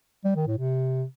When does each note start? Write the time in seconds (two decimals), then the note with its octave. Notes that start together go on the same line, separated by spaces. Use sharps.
0.25 G3
0.36 D#3
0.47 A2
0.58 C3